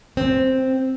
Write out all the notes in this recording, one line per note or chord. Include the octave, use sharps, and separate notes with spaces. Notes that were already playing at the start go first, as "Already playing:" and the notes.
C4